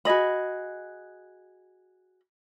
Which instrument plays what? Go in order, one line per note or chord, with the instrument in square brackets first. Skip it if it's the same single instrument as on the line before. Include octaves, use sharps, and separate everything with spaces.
[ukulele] F#4 G#4 D#5 B5